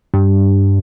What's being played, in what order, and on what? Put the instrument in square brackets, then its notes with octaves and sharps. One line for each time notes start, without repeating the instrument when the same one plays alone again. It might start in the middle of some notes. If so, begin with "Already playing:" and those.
[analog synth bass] G2